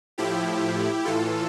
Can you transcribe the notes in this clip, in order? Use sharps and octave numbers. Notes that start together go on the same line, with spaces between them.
A2 F3 E4 G4
A2 E3 F4 A4